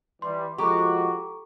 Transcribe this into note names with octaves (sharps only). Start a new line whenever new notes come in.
E3 G3 C6
F3 G#3 F#4 G4 A4 A#5 C#6